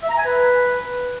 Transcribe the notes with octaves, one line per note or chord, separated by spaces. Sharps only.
E5
A#5
G#5
B4